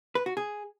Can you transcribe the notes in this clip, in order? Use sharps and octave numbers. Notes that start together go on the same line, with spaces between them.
B4
F#4
G#4